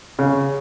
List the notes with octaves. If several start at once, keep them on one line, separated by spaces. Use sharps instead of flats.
C#3